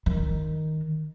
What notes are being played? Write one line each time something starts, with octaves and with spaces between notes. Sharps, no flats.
D#3